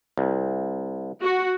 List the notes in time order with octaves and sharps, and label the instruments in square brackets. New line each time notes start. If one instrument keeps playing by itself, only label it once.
[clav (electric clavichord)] C2
[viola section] F#4